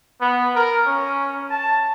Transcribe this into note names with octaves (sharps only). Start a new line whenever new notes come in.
B3
A#4
C#4
A5